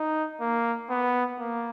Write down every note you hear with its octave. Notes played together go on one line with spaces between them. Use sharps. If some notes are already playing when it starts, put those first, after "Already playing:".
Already playing: D#4
A#3
B3
A#3